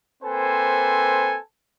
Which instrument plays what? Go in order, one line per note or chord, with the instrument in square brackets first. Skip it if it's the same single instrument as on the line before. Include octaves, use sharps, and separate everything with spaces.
[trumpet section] A#3 C4 A4 B4 C5 G#5